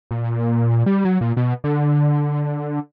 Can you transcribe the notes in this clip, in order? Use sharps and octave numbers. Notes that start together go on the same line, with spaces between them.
A#2
G3
F#3
A#2
B2
D3